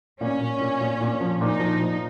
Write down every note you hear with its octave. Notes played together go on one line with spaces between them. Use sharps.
A#2 C#4
A#2
A#2
A#2
A#2
F3
A#2 D#4
F3
A#2